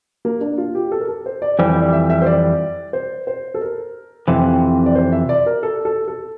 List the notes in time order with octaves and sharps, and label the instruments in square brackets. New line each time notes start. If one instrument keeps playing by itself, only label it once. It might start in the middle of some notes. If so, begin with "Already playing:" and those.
[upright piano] A#3
D4
F4
G4
A4
A#4
A4
C5
D5
[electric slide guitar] F2 E3 G3 [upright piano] C5
[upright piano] D5
E5
E5
C5
D5
C5
C5
A4
A#4
[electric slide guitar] F2 C3 E3
[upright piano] D5
C5
E5
D5
A#4
A4
A4
A4